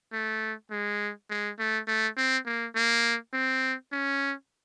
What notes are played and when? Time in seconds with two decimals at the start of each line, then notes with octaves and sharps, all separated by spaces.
0.12 A3
0.71 G#3
1.30 G#3
1.59 A3
1.87 A3
2.17 C4
2.46 A#3
2.75 A#3
3.33 C4
3.92 C#4